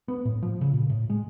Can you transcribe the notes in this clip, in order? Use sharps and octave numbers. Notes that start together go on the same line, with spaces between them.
B3
A2
F3
C#3
A#2
A2
G#3